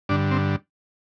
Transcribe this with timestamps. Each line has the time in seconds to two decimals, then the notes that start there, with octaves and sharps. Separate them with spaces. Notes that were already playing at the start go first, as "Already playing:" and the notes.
0.09 G2 D3 D4
0.31 C4